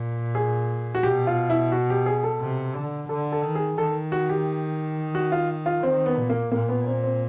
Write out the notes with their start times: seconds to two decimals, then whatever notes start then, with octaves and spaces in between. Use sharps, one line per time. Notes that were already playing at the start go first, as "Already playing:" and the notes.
Already playing: A#2
0.35 G#4
0.95 F#4
1.03 B2 G4
1.27 F4
1.50 E4
1.72 F#4
1.90 G4
2.06 G#4
2.24 A4
2.41 C3
2.75 D3
3.09 D3 A4
3.32 A4
3.43 D#3
3.55 G#4
3.78 D#3 A4
4.12 F#4
4.30 G4
5.15 F#4
5.32 F4
5.66 F4
5.83 D#3 C4
6.06 B3
6.18 A#2
6.30 A#3
6.52 A#2 A#3
6.69 B3
6.87 C4
7.03 C4